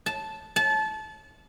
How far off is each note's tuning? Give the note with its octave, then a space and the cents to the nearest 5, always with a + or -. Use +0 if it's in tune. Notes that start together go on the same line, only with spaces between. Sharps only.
A5 -10
A5 -25